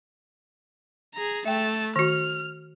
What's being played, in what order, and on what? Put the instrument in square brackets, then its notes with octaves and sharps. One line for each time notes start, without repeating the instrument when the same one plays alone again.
[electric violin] G#4 A#5
[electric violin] A3 A5 [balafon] E5 G5
[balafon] D#3 F#4 [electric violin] F6